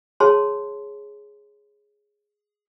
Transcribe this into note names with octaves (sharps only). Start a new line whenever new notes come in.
G#4 C#5 A5 C6